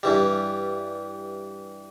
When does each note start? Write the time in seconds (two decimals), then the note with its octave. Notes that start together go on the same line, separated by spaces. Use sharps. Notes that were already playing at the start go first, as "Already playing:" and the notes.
0.03 G2 E3 G3